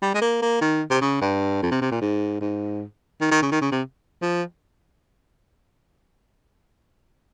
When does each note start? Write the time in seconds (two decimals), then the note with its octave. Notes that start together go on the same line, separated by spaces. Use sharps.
0.02 G3
0.14 G#3
0.21 A#3
0.42 A#3
0.61 D#3
0.90 C3
1.01 C#3
1.21 G2
1.62 F2
1.71 C3
1.81 C3
1.91 A#2
2.01 G#2
2.41 G#2
3.21 D#3
3.31 D#3
3.42 C#3
3.52 D#3
3.61 C#3
3.71 C3
4.22 F3